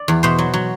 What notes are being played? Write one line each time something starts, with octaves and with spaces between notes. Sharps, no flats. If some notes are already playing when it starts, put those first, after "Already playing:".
Already playing: D5
E2
B2 C5
F#3
F#3